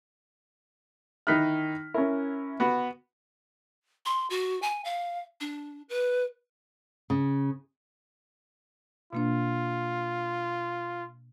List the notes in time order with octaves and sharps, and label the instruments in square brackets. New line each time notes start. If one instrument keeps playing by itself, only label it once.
[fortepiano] D#3 D#4 E4 [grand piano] F6 F#6 B6
[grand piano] C#4 E4 [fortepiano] A#4
[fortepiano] B3 F#4
[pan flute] C6
F#4
G#5
F5
D4
B4
[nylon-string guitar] C#3
[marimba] B2 A#3 D4 [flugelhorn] F4